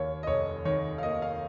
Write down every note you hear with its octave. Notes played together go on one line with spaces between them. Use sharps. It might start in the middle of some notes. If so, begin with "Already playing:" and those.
Already playing: D#2 A#3 C#5
D#5
F1 C#5
D#3 C#5
F5
A#3 D#5
F5